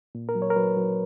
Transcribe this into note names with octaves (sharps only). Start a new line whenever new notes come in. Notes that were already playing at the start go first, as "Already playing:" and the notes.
A#2
A#4
F#3
C#5
A#4
F#3 B4
F#3